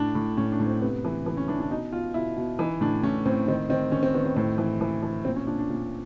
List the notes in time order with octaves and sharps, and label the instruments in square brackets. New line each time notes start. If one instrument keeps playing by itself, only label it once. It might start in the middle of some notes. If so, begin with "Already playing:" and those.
Already playing: [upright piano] A2 D4
A2
A2 C#4
D4
A2
C4
C3 B3
E3
E3
C#4
E3 D4
D4
B2 D#4
B2 F4
B2 E4
B2
E3 D#4
A2 D4
A2 C#4
A2 C4
D#3 C4
D#3 C4
D#3 C#4
C4
D#3 B3
C4
A2 C4
E3
E3
E3
A#2 C4
C#4
A#2 D4
D4
A#2